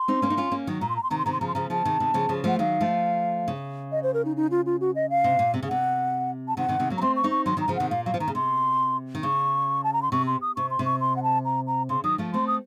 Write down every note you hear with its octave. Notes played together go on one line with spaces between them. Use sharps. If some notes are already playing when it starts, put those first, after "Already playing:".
Already playing: C6
C4 D#4
A#3 C#4
D#4
C#4 F4
A#3 C#4
D#3 F#3
A#2 A#5
C6
A#5
C6
C3 D#3 A#5
C6
C3 D#3 A#5
C6
C#3 F3 A#5
C6
C#3 F3 A#5
C#3 F3 A5
C3 D#3
C3 D#3
C#3 F3
C#3 F3
F3 A3 F#5
D#3 F#3 F5
F3 A3
C#3
D#5
C5
A#4
D#4
D#4
F4
F4
F#4
D#5
F5
C3
A#2
C3
C#3
C3 F#5
A5
C3 D#3 F#5
C3 D#3
C3 D#3
F#3 A#3
C#4 A#5
A3 C4 C6
C#6
C4 D#4
C#6
D#3 F#3 C6
D#3 F#3 A#5
C#3 F3
C3 D#3 F#5
A#2 F5
F#3 F5
F3
D#3 A#5
C#3
C3 C6
D#3
C#3 C#6
A5
A#5
C6
C3 C#6
C6
D#6
C3 C#6
C6
C3
C#6
C6
F#5
A5
A#5
A#5
C#3 C6
D#3 F#3 D#6
F3 A3
A3 C4 C6
D#6